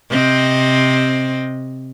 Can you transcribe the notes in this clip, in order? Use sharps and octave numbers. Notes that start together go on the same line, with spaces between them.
C3 C4 D#5